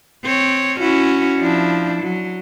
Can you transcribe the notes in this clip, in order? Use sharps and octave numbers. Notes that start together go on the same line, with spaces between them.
C4 C#5
C#4 E4 F#4
F3 D4 E4
F#3